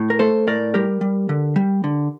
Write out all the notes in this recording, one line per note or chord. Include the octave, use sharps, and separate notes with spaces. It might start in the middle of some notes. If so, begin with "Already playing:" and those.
Already playing: A2
A#4
A3 A4 C5
A2 A#4 D5
G3 G4 A#4
G3
D3
G3
D3